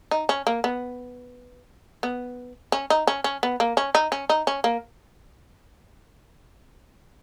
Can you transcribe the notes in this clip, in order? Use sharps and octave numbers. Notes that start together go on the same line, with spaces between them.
D#4
C#4
A#3
B3
B3
C#4
D#4
C#4
C#4
B3
A#3
C#4
D#4
C#4
D#4
C#4
A#3